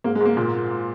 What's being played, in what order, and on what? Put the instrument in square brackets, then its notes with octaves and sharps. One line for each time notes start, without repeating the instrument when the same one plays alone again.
[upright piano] G#2 A#3
G#3
G#2 A#3
A#2